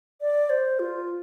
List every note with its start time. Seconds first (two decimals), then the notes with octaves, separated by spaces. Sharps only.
0.21 D5
0.50 C5
0.79 F4